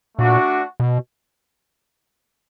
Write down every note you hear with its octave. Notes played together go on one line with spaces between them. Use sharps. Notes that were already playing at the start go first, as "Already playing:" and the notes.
A#2 A3 D4 F#4
B2